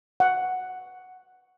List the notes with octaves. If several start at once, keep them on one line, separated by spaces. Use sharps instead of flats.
F#5